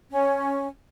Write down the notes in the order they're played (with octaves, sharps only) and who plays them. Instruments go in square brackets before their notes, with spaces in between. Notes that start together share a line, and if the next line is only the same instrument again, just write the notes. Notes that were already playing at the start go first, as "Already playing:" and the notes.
[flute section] C#4